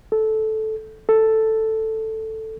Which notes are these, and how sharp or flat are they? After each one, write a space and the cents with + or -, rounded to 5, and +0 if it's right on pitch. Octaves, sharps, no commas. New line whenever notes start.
A4 -10
A4 +5